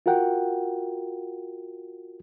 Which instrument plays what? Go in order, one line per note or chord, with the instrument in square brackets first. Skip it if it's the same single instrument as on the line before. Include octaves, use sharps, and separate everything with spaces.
[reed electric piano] F4 F#4 A#4 F#5 G5